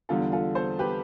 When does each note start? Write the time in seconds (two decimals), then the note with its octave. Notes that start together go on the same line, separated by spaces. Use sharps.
0.09 E2 D3 G3 F4 A4
0.32 F4 A4
0.55 A4 C5
0.79 G4 B4